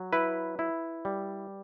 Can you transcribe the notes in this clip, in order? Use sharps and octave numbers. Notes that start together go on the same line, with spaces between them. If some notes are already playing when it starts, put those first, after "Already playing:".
Already playing: F#3
E4 B4
E4
G3